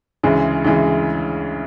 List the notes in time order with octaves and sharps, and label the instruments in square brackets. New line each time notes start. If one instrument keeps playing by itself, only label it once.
[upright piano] D2 C#3 E3 G#3
D2 C#3 E3 G#3